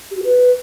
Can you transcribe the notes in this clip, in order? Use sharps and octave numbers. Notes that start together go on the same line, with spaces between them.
G4
F#4
B4